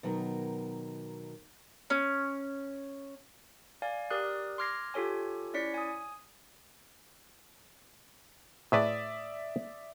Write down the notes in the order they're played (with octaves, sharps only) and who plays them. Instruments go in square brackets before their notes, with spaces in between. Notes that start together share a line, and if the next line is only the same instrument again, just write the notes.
[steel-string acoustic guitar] B2 D#3 F#3 A#4
[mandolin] C#4
[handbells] D5 F5 G#5
G4 A#4 D5 D#6 F#6
C6 D6 F6 G#6 A#6 C7
F4 G4 A4 C#5 G#5
C#4 E4 C#5 D5 B6 C#7
G#5 D#6
[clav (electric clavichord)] A2 G#4 B4 [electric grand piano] D5 E5 D#6